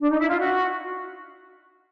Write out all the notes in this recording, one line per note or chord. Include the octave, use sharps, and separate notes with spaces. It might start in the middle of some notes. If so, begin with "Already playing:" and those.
D4
D#4
E4
F4
F#4